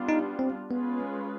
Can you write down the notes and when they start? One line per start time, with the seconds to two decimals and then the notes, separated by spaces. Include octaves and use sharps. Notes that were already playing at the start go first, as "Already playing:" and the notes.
Already playing: G3 B3 D4 F4
0.09 D#4
0.39 C4
0.71 G#3 B3 C#4 F4 G#4 B4